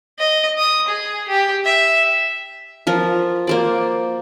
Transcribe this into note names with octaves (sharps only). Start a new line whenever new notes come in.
D#5
D#6
G#4
G4
E5
F3 F4 A#4
A#3 C5 D5